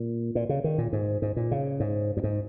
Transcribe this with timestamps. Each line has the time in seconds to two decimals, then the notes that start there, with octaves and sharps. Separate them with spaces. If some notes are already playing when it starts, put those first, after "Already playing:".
Already playing: A#2
0.35 A#2
0.49 C#3
0.64 D#3
0.78 A#2
0.93 G#2
1.22 G#2
1.37 A#2
1.51 C#3
1.80 G#2
2.17 F#2
2.24 G#2